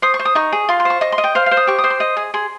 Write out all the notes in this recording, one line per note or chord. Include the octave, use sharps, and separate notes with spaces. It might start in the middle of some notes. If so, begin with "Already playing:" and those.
C5 D#6
C#6
C5
D#6
D#4 C#6
G#4
F4 C6
C6
C5 C#6
D#5 C#6
C6
D#5
G5
C5 F5
F5
C5
D#6
G4 C#6
D#6
C5
C6
D#5
G#4
G#4 C6